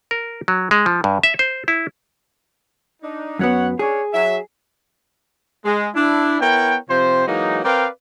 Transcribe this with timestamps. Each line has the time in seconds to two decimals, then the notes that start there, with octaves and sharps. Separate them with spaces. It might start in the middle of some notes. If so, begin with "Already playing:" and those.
0.11 A#4
0.48 F#3
0.71 G#3
0.86 F3
1.04 G2
1.23 E5
1.39 C5
1.68 E4
3.02 D4 D#4
3.39 F#2 F#3 B3 C#5 F#5
3.79 C#4 D4 G#4 C#5
4.14 F#3 E5
5.64 G#3
5.95 D4 E4
6.40 B3 E4 A#4 C#5 G5
6.88 C3 F3 C4 C5
7.26 E3 F#3 G#3 A#3 D#4
7.63 C4 A#4 B4 D5 F5 G5